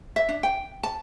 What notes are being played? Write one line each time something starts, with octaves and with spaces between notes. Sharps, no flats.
E5
D4
G5
A5